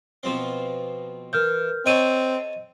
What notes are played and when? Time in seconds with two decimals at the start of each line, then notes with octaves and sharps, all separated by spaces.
0.23 B2 F3 C4
1.33 E3 A#4 F6 G6
1.86 C4 A4 C#5 D#5 G#5 D#7